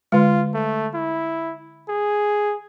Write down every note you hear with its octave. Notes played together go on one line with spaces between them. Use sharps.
D3 G#3 F4
A3
E4
G#4